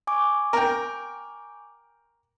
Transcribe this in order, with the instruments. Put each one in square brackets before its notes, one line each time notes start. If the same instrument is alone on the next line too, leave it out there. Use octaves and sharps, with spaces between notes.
[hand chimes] G#5 C#6 D6
[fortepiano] A#4 G5